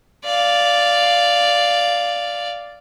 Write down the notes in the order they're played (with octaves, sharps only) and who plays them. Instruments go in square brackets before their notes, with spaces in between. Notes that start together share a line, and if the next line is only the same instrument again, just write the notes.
[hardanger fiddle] D5 F5